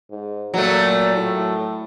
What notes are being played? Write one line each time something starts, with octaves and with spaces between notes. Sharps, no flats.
G#2
A#2 F#3 A3
A2